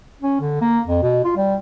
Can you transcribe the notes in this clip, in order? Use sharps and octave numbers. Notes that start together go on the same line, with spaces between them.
C#4
D3
A#3
F2
B2
F4
G3